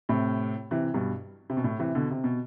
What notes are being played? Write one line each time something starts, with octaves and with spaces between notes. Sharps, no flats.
A2 C3
C3 E3
G2 B2
C3
B2
A2
C3 E3
B2 D3
C3
B2